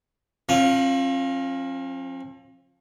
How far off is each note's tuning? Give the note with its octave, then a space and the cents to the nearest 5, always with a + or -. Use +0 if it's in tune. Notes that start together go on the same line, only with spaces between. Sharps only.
F3 +0 C4 +45